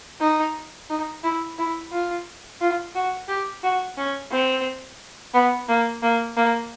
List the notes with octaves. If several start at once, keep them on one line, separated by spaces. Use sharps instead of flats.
D#4
D#4
E4
E4
F4
F4
F#4
G4
F#4
C#4
C4
B3
A#3
A#3
A#3